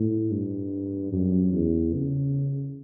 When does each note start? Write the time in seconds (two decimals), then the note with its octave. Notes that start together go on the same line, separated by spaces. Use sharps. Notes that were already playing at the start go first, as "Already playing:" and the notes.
Already playing: A2
0.31 G2
1.12 F#2
1.53 E2
1.94 C#3